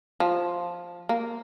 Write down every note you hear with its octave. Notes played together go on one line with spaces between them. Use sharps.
F3
A#3